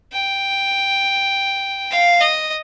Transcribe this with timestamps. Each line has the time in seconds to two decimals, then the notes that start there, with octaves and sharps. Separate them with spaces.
0.13 G5
1.91 F5
2.21 D#5